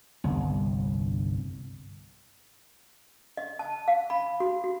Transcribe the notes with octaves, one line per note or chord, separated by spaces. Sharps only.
G1 C2
D#5
A5
F5
B5
F#4
F#4